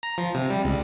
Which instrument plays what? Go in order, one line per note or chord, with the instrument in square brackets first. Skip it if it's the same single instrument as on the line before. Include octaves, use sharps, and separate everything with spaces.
[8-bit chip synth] A#5
F3
C3
G3
C#2